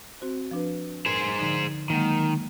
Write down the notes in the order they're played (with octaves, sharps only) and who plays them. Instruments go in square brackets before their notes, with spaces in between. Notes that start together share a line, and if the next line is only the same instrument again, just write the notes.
[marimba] C4 F#4 C5
F3 D4 B4
[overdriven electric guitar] G#4 C5 [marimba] A#4
[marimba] D3 F3 D#4
[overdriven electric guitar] D#3 [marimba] F#3 G#3 A#3